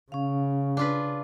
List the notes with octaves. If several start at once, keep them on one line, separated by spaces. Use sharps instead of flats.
C#3 C#4 F5
D4 F4 B4